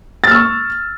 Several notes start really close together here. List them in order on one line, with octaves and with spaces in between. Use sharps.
A6 F6 E6 C#6